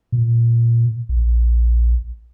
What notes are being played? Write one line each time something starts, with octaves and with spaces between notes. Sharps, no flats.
A#2
A#1